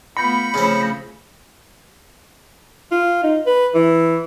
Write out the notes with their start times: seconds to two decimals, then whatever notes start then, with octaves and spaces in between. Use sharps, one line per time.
0.17 A3 B3 F4 B5 G6 A#6 C#7
0.54 C#3 F3 A3 C4 C#4
2.91 F4
3.23 D#4
3.46 B4
3.74 E3